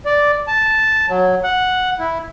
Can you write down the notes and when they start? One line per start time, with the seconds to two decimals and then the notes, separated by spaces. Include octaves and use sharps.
0.06 D5
0.48 A5
1.09 F#3
1.44 F#5
1.99 E4